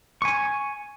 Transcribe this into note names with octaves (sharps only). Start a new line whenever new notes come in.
G#5 C#6